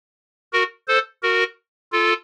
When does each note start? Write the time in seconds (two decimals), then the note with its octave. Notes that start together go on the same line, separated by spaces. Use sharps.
0.52 F#4 A#4
0.88 A4 C5
1.22 F#4 A#4
1.92 F4 A4